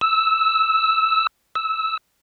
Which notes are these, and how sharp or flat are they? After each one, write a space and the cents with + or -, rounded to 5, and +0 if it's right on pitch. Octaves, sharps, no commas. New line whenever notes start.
E6 -5
E6 -10